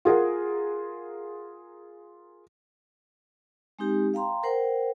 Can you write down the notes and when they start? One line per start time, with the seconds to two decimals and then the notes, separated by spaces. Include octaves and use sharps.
0.05 F4 G#4 A#4 F#5
3.79 G#3 C4 D#4 G4
4.14 F5 G5 A#5 C6
4.43 A#4 C5 F#5 G5